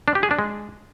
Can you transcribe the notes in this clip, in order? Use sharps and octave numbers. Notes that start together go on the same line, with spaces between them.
D4
G4
G#4
D4
G#3